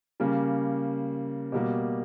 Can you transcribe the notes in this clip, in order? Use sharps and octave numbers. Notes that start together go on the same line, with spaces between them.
C#3 G3 A#3
B2 G3 A#3